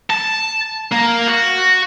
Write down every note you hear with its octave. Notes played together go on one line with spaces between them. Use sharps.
A5
A#3
F#4